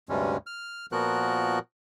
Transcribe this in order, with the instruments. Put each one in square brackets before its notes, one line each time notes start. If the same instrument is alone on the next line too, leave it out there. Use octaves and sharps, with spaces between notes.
[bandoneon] D2 G2 C3 G3 G#3 C#4
F6
A#2 F3 B3 F#4 A#4 F#6